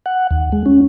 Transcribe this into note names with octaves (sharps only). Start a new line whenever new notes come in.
F#5
D#2
G#3
C#4